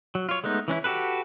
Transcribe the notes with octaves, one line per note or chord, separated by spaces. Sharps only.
F#3
F4 C#5
G#3 A3 B3 D#4
E3 C#4 D4 E4
F#4 G4 A4 B4